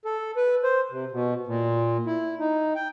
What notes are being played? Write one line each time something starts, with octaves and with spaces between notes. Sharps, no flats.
A4
B4
C5
C3
B2
A#2
E4
D#4
G5